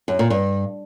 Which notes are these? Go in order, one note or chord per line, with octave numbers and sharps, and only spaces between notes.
F#2
A#2
G2